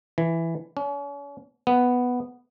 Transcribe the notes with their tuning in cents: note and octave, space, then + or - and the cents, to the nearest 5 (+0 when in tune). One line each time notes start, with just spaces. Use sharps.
E3 +5
C#4 +40
B3 +0